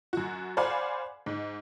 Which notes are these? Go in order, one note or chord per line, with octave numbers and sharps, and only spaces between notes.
F#2 F#4
C5 D5 F5 F#5 G#5 B5
G#2